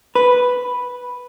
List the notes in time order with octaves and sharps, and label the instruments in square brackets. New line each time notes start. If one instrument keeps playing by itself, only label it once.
[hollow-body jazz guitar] B4